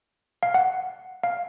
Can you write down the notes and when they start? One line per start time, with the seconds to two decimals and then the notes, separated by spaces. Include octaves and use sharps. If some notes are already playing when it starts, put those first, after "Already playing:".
0.43 F5
0.54 F#5
1.23 F5